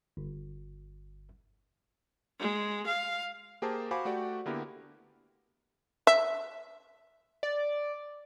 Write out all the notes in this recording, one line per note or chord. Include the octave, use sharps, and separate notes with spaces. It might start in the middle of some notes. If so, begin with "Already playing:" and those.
G1
G#3
F5
A#3 G4 G#4 A#4 C5 A5
F#4 C5 F5 G#5 B5 D6
A3 F#4 G4 D5 G5
D3 A#3 B3 E4 G4 A#4
E5
D5